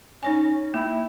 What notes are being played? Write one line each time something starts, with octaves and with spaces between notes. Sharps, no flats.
C#4 D#4 C#5 G#5
A#3 E4